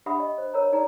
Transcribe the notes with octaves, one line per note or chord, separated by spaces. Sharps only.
D4 G4 E5 F#5 B5 D#6
D#5
C5
A#4 C#5 A#5
D#4 G#4 D5 A#5